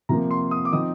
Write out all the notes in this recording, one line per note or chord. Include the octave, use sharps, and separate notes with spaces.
C3 F3 A#3 A#5
C6
D#6
D6
F3 C4 D#4 D#6